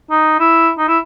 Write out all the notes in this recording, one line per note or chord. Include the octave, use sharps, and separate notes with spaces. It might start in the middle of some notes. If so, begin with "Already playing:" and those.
D#4
E4
D#4
E4